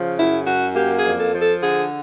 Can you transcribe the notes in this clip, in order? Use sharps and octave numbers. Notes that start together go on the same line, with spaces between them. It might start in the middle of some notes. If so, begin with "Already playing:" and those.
Already playing: C#3 F3
F#2 E4
F#2 F#4
A#3 G4
G#4
F2
A4
F3
A4
D3 G#4